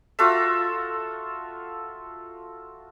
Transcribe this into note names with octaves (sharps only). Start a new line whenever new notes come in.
F4 F#4 A4 E5